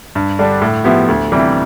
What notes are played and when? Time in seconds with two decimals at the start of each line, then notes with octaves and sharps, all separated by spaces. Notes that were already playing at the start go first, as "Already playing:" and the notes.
0.15 G2
0.39 D3 G3 D4
0.62 A2
0.84 F3 B3 E4 G4
1.08 D2
1.32 C3 E3 G3